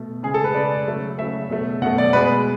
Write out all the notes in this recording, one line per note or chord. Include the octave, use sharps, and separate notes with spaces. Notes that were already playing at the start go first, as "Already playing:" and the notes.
Already playing: B2 A3
C#3 G#3 G#4
A4
B4
C#3 G#3 D5
C#3 F#3 A3
C#3 F#3 A3 E5
B2 F#3 A3
B2 F#3 A3 F#5
D5
B2 G#3 B4